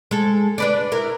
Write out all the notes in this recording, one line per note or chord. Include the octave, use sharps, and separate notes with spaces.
G#3 A4
D4 B4 D5
E4 A#4